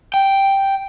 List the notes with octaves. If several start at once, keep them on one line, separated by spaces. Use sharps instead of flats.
G5